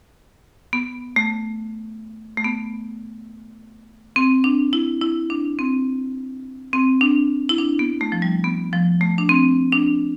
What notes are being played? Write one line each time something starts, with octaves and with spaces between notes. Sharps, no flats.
B3
A3
A3
B3
C4
D4
E4
E4
D4
C4
C4
D4
E4
D4
B3
A3
F3
G3
B3
F3
A3
D4
C4
D4